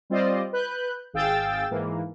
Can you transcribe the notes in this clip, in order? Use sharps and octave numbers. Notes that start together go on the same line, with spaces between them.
G3 C4 F4 C5 D5 D#5
B4 F#6 G6
G#1 G#4 F5 G5 E6 A6
G#2 E3 A#3